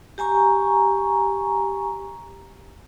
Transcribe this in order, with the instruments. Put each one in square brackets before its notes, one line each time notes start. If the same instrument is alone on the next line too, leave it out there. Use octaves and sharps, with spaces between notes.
[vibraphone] G4 G#5 A#5 C#6